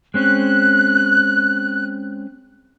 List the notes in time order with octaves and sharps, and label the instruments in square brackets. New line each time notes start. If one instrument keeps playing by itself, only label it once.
[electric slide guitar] G#3 C4 C#4 [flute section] F#6